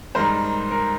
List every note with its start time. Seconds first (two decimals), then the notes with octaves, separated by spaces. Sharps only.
0.15 G#2 D#3 G3 A#4 C5
0.71 A#4